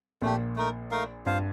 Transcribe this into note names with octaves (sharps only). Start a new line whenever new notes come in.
A#1 A#2 A3 D4 G4
A3 D#4 A#4
A3 D#4 A#4 F5
G2 F4 C5 F5